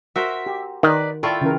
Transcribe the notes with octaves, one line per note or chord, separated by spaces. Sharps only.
F#4 A#4 C5 E5
G4
D#3 D#4 B4 D5
E4 F4 A4 D5 G5 C#6
C#3 E3 A#4